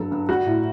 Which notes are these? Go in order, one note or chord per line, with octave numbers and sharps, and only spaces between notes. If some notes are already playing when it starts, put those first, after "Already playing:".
Already playing: G2 F#3 A4
G2
G3 F#4
A2